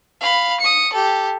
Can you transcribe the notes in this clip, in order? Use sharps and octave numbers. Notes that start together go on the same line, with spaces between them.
F5 B5
D#6 C#7
G4 A4